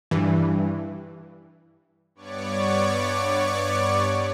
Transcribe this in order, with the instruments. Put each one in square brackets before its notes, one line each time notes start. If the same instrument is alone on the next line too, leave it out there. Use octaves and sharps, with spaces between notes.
[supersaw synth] G2 E3
G2 B3 C#5 D5 C#6 D6